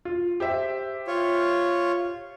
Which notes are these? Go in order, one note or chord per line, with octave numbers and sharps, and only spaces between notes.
F4
G4 C5 E5
F4 C#5